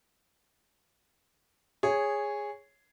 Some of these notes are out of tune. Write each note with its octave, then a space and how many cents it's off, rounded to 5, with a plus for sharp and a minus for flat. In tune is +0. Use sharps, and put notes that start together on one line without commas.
G#4 -10 C#5 +0